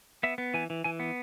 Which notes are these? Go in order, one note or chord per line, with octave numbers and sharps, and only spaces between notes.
B3 E5
B3
E3 G#5
E3
E3 G#5
B3